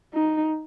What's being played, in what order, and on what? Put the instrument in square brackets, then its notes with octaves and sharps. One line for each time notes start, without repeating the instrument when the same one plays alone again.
[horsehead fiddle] D#4